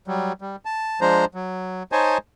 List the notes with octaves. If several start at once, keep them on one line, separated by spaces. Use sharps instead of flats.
F#3 G3
G3
A5
F3 G#3 D4 C5 A#5
F#3
D#4 C5 C#5 D#5 G#5 A5